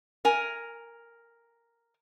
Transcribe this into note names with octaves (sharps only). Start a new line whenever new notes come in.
A#4 G#5